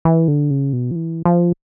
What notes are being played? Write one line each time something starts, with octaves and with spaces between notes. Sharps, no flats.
E3
D3
C#3
B2
F3
E3
F3